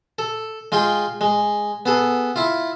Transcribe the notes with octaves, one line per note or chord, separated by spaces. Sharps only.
A4
G#3 F4 G#4 G5
G#3
B3 G#4 A4
E4 F4